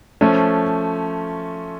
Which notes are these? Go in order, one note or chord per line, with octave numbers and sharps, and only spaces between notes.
F3 A3 C#4